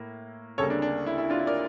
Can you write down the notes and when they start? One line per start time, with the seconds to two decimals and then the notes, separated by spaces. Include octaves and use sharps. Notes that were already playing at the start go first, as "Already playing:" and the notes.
Already playing: A2 A#3
0.58 D2 C#3 G3 A#3 A4 C#5
0.70 D4
0.82 D4
1.06 E4
1.18 E4
1.30 D4 F4
1.39 E4
1.47 A#4 D5